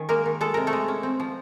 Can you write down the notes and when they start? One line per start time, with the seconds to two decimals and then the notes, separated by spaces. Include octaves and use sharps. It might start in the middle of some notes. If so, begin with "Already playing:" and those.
Already playing: D#3 C#4
0.09 G#3 A#3 A#4
0.26 D#3
0.41 G#3 A4
0.54 C3 A#4
0.67 A3 A4
0.73 G#3
0.88 C#4
1.03 C4
1.20 F3